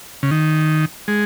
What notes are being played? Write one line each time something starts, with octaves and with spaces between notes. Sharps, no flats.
C#3
D#3
G#3